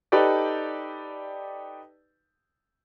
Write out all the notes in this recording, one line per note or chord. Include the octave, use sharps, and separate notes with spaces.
D#4 G4 A4 B4 D5